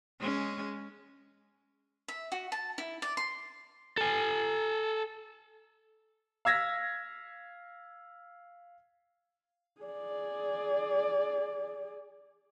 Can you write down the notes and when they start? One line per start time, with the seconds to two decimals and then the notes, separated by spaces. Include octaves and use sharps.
0.20 G#3 C#4
2.08 E5
2.32 F#4
2.52 A5
2.78 E4
3.02 D5
3.17 C6
3.98 A4 G#5
6.45 F5 E6 G#6 A#6 B6
9.81 G#4 D5